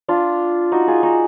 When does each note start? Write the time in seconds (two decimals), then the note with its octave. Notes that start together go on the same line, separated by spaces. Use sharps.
0.08 D4 F4
0.72 D#4 F#4
0.87 F4 G#4
1.03 D#4 F#4